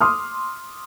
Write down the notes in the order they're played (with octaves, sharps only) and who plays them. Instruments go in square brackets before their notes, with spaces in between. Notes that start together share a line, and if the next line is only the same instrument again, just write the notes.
[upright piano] C6 D6 D#6 F6